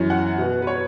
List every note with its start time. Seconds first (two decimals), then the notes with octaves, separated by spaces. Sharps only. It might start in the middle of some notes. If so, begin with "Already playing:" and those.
Already playing: F#2 E3 C#4
0.10 F#5
0.38 B2 B3
0.62 B4
0.67 C#5